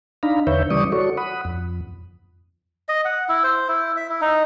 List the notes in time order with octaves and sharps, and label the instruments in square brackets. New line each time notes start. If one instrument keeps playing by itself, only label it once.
[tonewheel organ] D4 D#4 F5 A#5 B5
E2 D3 B4 C#5 E5 G6
C#3 E3 G3 D5 C#6 D#6
F#4 A4 C#5 D5 C#6
F#5 B5 D#6
F2
[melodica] D#5
F#5
E4
C5
E4
E5
E4
D#4